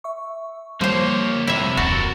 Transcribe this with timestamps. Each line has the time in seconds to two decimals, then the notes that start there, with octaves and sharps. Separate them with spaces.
0.04 E5 C#6
0.81 F3 G3 A#3 C5 C#5
1.47 F2 C3 E4 E5
1.77 D1 F2 C4 F#4 A4 A#4